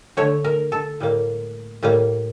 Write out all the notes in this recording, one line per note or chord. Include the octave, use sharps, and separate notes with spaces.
D3 A3 C#5
A#4
A4
A2 G3 A#3
A2 G3 A#3